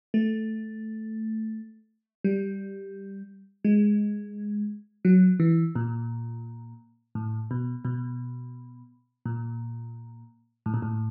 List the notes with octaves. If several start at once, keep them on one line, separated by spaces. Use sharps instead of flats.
A3
G3
G#3
F#3
E3
A#2
A2
B2
B2
A#2
A2
A#2
A2